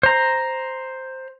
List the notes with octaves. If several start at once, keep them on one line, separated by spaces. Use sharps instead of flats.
C5 A#5